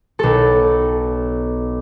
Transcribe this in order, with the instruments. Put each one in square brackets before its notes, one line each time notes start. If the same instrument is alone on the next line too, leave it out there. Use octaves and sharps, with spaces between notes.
[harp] B1 A4